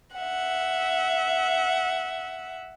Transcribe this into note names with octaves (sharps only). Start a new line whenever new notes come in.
E5 F#5